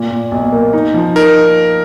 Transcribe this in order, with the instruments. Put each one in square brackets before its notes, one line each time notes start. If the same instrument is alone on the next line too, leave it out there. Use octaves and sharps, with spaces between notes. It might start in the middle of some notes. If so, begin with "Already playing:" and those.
Already playing: [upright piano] A#2
A#2
B1
A#3
D#4
F3
[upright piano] D#4 [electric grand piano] A#4